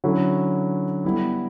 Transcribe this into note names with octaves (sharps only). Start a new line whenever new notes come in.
D3 F#3 C#4 E4
G3 B3 E4